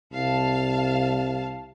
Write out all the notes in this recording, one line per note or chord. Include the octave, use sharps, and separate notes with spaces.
C2 F5 A5